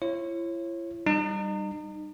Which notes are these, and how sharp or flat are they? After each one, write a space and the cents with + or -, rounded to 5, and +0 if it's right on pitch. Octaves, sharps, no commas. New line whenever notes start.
E4 +40 C#5 -30
G3 +0 D#4 -35